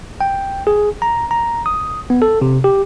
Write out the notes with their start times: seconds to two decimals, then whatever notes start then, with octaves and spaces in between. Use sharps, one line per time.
0.21 G5
0.67 G#4
1.02 A#5
1.31 A#5
1.66 D#6
2.10 B3
2.22 A4
2.41 C3
2.64 G4